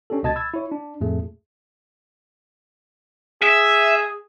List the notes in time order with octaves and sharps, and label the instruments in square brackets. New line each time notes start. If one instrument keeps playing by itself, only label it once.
[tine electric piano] C#4 D4 G4 A4
C#2 B2 D#5 A5 G#6 A6
B5 E6 G#6 A6
E4 C#5
D4
F2 A2 A3 G#4
[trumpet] G#4 [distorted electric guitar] E5